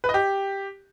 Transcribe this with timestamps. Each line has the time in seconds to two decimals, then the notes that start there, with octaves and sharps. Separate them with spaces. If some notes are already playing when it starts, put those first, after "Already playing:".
0.04 B4
0.09 D#5
0.14 G4